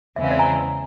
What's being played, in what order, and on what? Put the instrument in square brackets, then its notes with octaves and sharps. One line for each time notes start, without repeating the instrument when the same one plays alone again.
[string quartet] E2 C#3 E3 G#3 C4 [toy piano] E5
[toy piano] F5
D5 E5
G#5 A#5